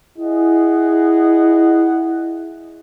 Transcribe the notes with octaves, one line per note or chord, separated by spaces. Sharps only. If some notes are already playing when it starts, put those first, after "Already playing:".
E4 G#4 D#5 F#5